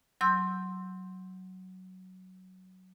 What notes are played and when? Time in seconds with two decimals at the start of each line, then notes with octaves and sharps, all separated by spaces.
0.21 F#3 C6 E6 G6